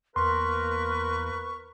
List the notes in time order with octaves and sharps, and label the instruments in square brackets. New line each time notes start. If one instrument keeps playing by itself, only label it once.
[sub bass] E2 [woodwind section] A#3 A#4 B4 [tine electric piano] C6 [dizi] C#6